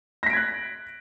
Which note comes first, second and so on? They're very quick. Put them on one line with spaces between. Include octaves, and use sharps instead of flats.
A#6 B6 D7 G#6 F#6